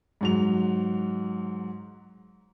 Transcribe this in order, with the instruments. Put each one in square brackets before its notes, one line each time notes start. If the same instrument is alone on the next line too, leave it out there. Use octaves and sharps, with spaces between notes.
[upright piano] G#2 F#3 F7